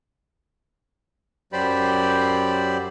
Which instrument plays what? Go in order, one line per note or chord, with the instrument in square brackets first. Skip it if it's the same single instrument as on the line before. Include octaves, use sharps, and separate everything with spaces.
[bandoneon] F#2 F#3 G4 C5 D5 B5